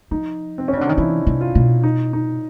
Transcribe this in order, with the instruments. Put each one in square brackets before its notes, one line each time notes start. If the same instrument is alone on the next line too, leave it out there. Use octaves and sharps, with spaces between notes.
[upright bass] F3 [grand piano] D#4
[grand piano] C4
C#4
[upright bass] C#3
[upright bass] D3 [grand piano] D4
[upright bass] D#3 [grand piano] D#4
[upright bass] E3 [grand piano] E4
[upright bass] C3
[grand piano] F4
[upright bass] B2
[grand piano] D#4
D#4